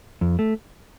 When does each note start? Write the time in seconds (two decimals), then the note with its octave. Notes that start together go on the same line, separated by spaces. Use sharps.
0.21 F2
0.39 A3